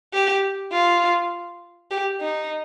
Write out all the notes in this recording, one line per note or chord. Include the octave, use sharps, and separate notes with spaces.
G4
F4
G4
D#4